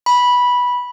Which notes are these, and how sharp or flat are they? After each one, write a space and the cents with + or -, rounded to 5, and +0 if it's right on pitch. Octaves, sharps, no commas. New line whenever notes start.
B5 -10